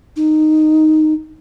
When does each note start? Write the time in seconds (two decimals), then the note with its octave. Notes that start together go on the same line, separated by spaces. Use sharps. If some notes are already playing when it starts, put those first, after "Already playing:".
0.16 D#4